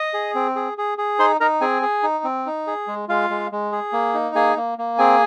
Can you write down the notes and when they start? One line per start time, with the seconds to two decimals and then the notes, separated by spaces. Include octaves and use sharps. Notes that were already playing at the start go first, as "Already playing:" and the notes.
Already playing: D#5 D#6
0.14 G#4
0.35 C4
0.55 G#4
0.78 G#4
0.98 G#4
1.19 D#4 C5 C6
1.40 D#4 A#4 A#5
1.61 C4 G#4 G#5
1.82 G#4
2.03 D#4
2.24 C4
2.46 D#4
2.67 G#4
2.87 G#3
3.08 G#3 F4 F5
3.30 G#3
3.52 G#3
3.72 G#4
3.93 A#3
4.14 D#4
4.35 A#3 G#4 G#5
4.56 A#3
4.78 A#3
4.98 C4 G#4 G#5